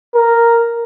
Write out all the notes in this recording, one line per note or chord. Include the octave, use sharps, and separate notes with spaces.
A#4